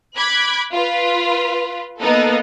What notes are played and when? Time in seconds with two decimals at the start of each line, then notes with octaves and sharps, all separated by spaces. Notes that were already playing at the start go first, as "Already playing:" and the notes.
0.17 B5 D6 F#6 G#6
0.73 F4 B4
2.00 A#3 B3 D#4 A4